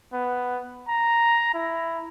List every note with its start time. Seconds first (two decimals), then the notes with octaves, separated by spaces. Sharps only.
0.13 B3
0.88 A#5
1.54 E4